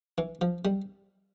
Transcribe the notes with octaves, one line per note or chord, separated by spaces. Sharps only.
E3
F3
G3